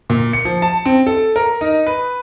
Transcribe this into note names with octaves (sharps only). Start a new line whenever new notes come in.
A#2
C#7
F3
A5
C4
A4
A#4
D#4
B4